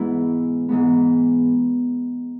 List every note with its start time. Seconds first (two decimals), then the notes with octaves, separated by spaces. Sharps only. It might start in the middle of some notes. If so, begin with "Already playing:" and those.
Already playing: G#2 E3 G#3 B3 E4
0.69 G#2 E3 G#3 B3